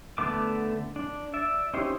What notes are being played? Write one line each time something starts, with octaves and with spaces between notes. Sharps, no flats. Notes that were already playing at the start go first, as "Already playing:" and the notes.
D3 A3 B3 D6
D4
D5 E5
C#4 D#4 E4 G4 C5